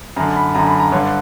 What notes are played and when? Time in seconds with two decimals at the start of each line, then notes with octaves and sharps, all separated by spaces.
0.16 F#2 A#5
0.20 D3
0.36 B5
0.55 F#2 D3 A#5
0.67 B5
0.80 A#5
0.92 G2 D3 C#5